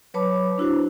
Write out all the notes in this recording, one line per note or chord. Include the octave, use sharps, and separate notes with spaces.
F#3 B4 C#5 A5 B5 D6
D4 E4 F#4 C5